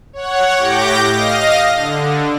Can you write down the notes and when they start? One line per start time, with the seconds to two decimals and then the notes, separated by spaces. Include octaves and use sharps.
0.13 C#5 F#5
0.57 A2 G4 D6 G6 A#6
1.09 D#5 F5 A#6
1.75 D3